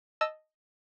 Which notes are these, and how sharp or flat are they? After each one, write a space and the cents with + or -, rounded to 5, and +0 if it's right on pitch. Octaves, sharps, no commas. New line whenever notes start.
D#5 +0 A5 +0 E6 +0